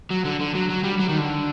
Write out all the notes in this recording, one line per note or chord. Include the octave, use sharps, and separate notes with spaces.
F#3
D3
D3
F#3
F#3
G3
F#3
D#3
D3